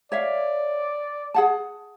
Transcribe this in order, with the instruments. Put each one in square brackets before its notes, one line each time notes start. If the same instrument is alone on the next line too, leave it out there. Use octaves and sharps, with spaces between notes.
[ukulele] C#5 E5 F5 [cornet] D5
[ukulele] G#4 F#5 A5